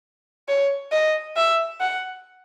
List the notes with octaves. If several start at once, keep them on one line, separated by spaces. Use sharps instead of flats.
C#5
D#5
E5
F#5